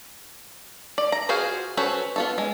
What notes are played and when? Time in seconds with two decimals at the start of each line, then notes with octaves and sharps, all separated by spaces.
0.98 D5
1.12 A#5
1.29 F4 F#4 G#4 C5 F5
1.77 C#4 F#4 A4 B4 C5
2.16 B3 F4 A4
2.38 G#3